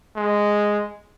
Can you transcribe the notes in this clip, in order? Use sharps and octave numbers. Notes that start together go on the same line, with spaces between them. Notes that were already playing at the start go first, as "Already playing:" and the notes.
G#3